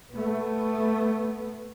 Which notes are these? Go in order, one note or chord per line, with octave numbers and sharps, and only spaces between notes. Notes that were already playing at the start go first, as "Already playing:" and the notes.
A3 B3